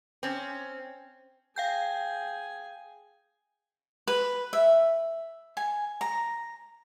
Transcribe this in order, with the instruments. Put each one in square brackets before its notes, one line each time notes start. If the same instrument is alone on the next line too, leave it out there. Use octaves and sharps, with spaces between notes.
[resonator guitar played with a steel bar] C4 C#4
[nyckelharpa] G#4 G#5 [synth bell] F5 G5 G6
[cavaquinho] B4
E5
G#5
A#5